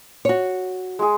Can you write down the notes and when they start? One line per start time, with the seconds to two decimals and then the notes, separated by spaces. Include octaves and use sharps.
0.25 F#4 C#5
0.99 G#3 G#4